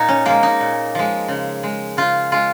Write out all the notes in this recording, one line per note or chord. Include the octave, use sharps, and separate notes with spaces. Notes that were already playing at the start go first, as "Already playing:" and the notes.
Already playing: A#2 D#4
C#4
F3 G#3 A#3
D#4
A#2
F3 G#3
C#3
G#3
C#3 F4
G#3 F4